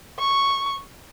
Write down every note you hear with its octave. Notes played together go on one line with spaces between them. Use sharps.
C#6